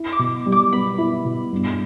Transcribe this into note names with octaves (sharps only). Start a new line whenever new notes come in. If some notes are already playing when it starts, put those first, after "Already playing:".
Already playing: E4
D6
B2
G3
D6
B3 B5
E4
B2
G2